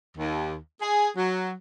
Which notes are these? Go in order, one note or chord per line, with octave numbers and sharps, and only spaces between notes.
D#2
G#4
F#3